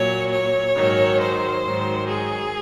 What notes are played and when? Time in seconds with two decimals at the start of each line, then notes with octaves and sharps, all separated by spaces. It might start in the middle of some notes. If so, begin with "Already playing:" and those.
Already playing: A#2 F#3 C#5
0.31 C#5
0.75 G#2 D#3 F#3
1.20 C5
1.63 G#2 D#3 F#3
2.08 G#4